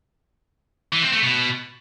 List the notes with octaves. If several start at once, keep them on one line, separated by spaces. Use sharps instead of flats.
E3
C4
A3
B2